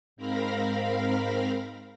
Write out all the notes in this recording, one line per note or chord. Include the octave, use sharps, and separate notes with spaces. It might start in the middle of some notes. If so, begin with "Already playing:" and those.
G#2 C4 A#4 F5 B5 A#6